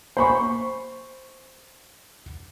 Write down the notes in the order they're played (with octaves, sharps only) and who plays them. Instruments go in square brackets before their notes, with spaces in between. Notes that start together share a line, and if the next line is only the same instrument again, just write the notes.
[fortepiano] C5 B5 C#6